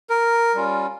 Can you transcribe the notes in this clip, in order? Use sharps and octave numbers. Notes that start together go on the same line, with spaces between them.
A#4
G3 C#4 F4